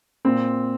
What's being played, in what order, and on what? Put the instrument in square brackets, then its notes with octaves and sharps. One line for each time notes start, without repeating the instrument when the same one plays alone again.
[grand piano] A#2 C4